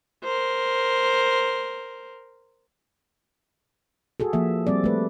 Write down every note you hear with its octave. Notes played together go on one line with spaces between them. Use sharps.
A#4 C5
F#4 G#4 A4
F3 A#3 E5
G3 C4 D5
A3 B4